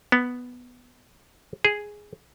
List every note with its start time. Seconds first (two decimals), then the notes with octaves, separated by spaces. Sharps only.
0.12 B3
1.65 G#4